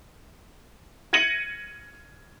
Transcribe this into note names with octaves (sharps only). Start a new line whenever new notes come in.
G#6 A#6 C#7 D#7 F#7